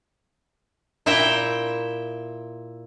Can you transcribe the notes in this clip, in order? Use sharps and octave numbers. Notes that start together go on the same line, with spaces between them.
A#2 E4 E5 G5 A#5